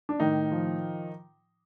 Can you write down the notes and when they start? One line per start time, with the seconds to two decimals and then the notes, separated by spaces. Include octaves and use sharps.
0.09 D4
0.19 A2 D#3 D#4
0.51 F3